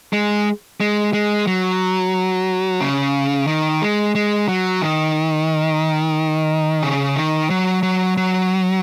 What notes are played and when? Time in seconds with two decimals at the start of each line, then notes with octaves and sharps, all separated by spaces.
0.13 G#3
0.80 G#3
1.13 G#3
1.47 F#3
2.81 C#3
3.47 D#3
3.82 G#3
4.15 G#3
4.48 F#3
4.82 D#3
6.83 C#3
7.16 D#3
7.50 F#3
7.83 F#3
8.17 F#3